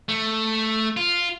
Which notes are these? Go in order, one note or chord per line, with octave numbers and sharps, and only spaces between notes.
A3
F4